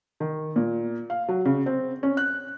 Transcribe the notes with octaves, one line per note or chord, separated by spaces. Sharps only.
D#3
A#2
F5
F#3
C#3
C4
C#4
F#6